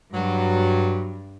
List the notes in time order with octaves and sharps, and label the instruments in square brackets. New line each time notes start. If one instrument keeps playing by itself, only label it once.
[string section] G2 [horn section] F#3